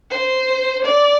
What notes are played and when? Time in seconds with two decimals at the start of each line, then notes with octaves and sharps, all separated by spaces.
0.10 C5
0.85 D5